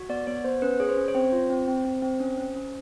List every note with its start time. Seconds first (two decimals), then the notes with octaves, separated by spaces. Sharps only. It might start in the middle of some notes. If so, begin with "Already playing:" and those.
Already playing: F#4
0.09 B3 D5
0.27 B3 C#5
0.44 B3 C5
0.62 C#4 B4
0.80 G#4 C#5
0.89 C5
0.97 C#4
1.08 C#5
1.15 C4 C5
1.32 F4
1.50 C4
1.68 C4
1.85 C4
2.02 C4
2.20 C#4
2.38 C#4
2.55 C#4